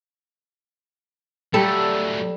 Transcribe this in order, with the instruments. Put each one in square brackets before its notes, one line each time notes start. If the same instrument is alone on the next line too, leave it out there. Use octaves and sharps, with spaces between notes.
[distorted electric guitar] F#3 A3 [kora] G3 [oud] A4